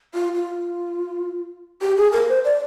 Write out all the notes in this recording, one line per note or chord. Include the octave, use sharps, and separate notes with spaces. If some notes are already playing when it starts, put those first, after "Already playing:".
F4
F4
G4
G#4
A#4
C5
D5